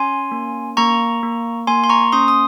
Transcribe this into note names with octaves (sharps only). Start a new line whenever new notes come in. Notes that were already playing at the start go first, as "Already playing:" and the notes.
Already playing: C#4 G#5 C6
A#3
A#3 A#5 C#6
A#3
A#3 G#5 C6
C6
A#5 C#6
C#4 C6 D#6
D#6